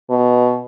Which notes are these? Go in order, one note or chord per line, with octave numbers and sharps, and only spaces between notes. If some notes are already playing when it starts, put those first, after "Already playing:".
B2